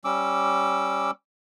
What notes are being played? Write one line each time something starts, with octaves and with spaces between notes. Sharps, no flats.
G3 C#4 D6 E6